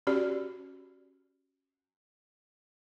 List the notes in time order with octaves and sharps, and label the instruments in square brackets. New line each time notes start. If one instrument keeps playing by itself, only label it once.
[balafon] C#4 F#4 G4 D5